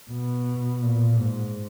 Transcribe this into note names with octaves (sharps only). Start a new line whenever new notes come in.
B2
A#2
G#2